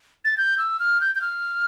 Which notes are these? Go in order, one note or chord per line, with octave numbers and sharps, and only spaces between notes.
A6
G6
E6
F6
G6
G6
F6